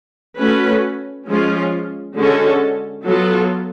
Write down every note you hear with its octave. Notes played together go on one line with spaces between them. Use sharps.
A3 C#4 F#4 B4
F3 G#3 C#4 F4
D3 G#3 C#4 F#4 A4
F#3 B3 F4 A4